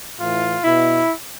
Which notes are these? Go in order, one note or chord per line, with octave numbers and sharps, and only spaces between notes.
A2 E3 F4
B2 E4